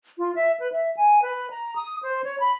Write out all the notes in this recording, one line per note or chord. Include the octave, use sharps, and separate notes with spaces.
F4
E5
B4
E5
G#5
B4
A#5
D#6
C5
C#5
B5